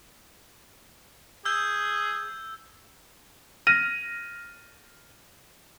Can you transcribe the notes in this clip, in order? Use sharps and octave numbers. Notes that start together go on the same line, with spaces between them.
G#4 E6 G6
F6 A#6 D#7